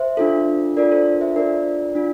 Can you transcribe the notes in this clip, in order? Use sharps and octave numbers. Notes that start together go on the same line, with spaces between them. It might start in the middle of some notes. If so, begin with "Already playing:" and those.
Already playing: C5 E5
D4 F4 A4
D4 F4 A4 A#4 D5
A4 C5
A4
C5 E5
D4 F4 A4 A#4 D5
D4 F4